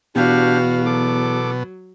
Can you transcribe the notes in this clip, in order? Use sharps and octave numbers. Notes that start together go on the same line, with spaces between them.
E2 B2 D4 F#4 G4 F5
F#3 A4 D6